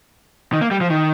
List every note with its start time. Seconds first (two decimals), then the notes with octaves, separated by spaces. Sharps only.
0.53 D#3
0.61 A#3
0.71 G3
0.81 F3
0.90 D#3